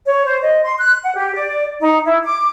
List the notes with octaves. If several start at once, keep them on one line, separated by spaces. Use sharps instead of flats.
C#5
C5
D#5
C6
F#6
F#5
G4
D5
D#4
E4
D6